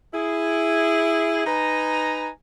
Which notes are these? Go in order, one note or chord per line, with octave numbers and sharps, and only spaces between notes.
E4 G#4
D#4 B4 G#5 A#5